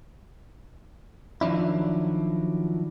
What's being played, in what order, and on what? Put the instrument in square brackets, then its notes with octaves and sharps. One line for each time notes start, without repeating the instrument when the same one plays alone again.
[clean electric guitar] D#3 F3 F#3 D4 E4